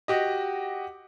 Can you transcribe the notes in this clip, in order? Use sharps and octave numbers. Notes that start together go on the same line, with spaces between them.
F#4 G4 D#5